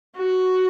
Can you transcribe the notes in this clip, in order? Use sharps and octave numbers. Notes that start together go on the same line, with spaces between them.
F#4